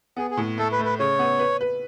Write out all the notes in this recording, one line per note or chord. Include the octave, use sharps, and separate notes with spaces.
B3 G#4
G#4
A2
A3 A4
B4
A3
B4
C#3 C#5
B3
B4
B4